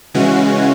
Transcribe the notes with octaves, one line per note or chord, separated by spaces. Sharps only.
C#3 E3 G#3 C#4 F#4